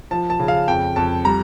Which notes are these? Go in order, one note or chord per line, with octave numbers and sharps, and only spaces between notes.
F3 A5
A5
C#3
F5
F2 G5
F2 A5
G3 A#5